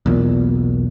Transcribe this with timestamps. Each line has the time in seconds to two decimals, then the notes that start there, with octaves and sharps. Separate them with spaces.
0.06 B1 E2 A#2